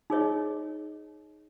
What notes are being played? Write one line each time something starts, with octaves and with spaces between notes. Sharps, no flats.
D#4 G#4 C#5 D#5